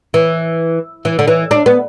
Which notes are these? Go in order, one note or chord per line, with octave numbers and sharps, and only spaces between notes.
E3
E3
D3
E3
D4
B3